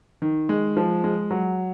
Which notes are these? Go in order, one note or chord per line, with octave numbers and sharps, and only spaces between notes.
D#3
G#3
F3
G#3
F#3